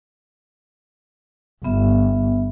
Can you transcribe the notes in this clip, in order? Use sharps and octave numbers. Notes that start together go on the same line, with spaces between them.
G1 B3 E5